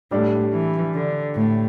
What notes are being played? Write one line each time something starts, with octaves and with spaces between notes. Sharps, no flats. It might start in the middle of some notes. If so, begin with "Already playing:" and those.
A2 G3 D4 A4 D5
E3
D3
A2